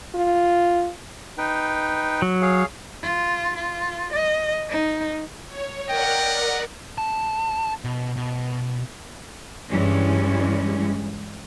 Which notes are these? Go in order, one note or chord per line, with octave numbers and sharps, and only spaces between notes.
F4
D#4 B4 G5
F#3
G#4 C#5 F5
F4
F4
D#5
D#4
C#5
A#4 B4 D5 D#5 F#5 G5
A5
B2
B2
G2 E3 G3 G#3 C#4